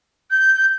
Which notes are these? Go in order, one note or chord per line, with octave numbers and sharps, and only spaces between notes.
G6